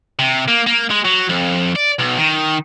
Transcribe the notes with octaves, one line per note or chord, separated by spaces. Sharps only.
C3
A#3
A#3
G#3
F#3
F2
D5
B1
D#3